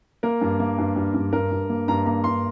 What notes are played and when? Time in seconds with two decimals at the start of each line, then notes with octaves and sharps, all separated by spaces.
0.23 A#3 A#4
0.41 G2
0.60 A#3
0.78 G2
0.96 G2
1.14 G2
1.33 G2 A#4
1.51 G2
1.70 A#3
1.88 G2 A#5
2.06 A#3 A#5
2.24 G2 C6